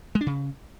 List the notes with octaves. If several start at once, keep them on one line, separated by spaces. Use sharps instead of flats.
G#3
D4
C#3